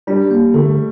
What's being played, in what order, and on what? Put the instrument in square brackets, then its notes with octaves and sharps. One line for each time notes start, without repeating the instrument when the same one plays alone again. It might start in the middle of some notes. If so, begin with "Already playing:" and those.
[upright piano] G3 [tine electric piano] D4
[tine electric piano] A#3
[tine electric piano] D3 [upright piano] A3